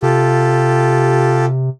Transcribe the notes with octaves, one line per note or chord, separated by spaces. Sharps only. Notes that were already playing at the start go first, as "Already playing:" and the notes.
C3 F4 G4 A4